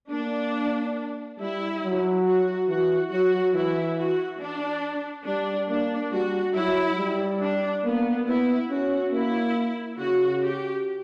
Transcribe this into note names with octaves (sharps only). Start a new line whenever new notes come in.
A#3 D4
G3 E4
F#3
F#4
E3 F#4
F#3 F#4
E3 E4
F#4
D4
G3 D4
A#3 D4
G3 F#4
F#3 E4
G3
D4
A#3 B3
B3 E4
C#4 F#4
A#3 E4
C#3 F#4
G4